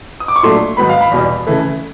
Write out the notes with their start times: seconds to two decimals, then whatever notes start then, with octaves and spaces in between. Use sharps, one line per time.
0.20 D#6
0.28 D6
0.36 C#6
0.43 A#2 F#3 A3 D4 C6
0.77 G#2 D#3 F#3 B3 B5
0.89 F5
1.01 B5
1.11 E2 B2 G3
1.47 C#3 E3 A3